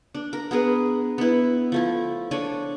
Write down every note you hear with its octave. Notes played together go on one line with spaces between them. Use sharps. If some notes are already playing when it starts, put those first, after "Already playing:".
D4
A#4
B3 G#4 A#4 B4
B3 E4
F3 A3 E4
D4 A4 C#5 G#5